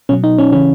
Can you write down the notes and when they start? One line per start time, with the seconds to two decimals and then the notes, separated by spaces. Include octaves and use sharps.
0.09 B2 F#3 C#4
0.24 D#4
0.38 C#4
0.52 C#3 E3 C#4